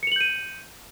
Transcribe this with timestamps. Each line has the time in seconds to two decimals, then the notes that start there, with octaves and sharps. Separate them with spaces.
0.03 C#7
0.07 F7
0.12 F#7
0.16 G6
0.21 D#7